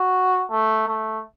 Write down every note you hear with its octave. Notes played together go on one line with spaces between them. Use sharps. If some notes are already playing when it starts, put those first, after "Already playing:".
Already playing: F#4
A3
A3